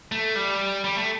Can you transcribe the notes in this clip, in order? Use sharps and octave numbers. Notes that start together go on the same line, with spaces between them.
A3
G3
G3
A3